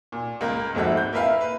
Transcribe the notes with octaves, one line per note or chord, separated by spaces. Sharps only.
A#2
C#2 A#3
G#1 F2 G#3 F#4 E5
G6
A#3 E4 B4 E5 F5
B4